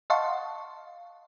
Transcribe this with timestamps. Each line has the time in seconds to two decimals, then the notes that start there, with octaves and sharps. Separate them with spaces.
0.10 D#5 F5 F#5 A5 C6 C#6